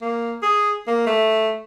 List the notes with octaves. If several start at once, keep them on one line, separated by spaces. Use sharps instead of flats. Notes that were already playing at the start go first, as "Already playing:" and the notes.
A#3
G#4
A#3
A3